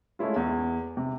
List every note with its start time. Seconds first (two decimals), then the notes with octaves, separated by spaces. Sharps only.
0.19 G#3 A3 C#4 E4 F4
0.36 E2
0.97 C3